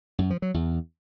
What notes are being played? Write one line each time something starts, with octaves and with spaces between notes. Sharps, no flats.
F#2
F3
F#3
E2